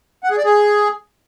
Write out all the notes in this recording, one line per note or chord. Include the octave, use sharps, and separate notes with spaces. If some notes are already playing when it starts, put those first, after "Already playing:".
F#5
G#4
D5
G#4